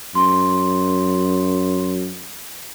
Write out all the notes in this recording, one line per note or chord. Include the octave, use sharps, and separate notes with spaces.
F#2 C6